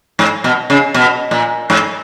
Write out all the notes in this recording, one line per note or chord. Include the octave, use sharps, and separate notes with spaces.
G#2
B2
C#3
B2
A#2
G#2